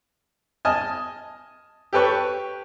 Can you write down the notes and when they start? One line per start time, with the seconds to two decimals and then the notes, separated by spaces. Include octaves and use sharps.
0.65 D#5 G#5 A5 F6
1.93 G4 A4 B4 C#5